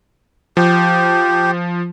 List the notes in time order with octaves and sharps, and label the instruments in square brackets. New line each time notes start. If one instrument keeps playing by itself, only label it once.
[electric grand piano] F3 [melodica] G4